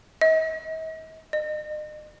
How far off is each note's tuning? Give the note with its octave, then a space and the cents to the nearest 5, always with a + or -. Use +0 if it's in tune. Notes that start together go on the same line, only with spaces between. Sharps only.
D#5 +45
D#5 -40